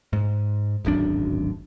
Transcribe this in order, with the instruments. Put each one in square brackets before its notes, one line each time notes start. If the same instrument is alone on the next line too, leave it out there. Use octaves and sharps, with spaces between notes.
[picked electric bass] G#2
D1 G#1 F#2 D4